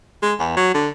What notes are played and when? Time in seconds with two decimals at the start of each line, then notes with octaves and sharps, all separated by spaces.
0.23 G#3
0.39 E2
0.57 F#3
0.74 D3